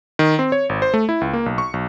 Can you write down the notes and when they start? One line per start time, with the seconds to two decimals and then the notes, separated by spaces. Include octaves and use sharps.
0.19 D#3
0.39 C4
0.52 C#5
0.69 G#1
0.82 C5
0.94 A3
1.09 E4
1.21 C#2
1.33 A#3
1.46 B1
1.58 C#6
1.74 B1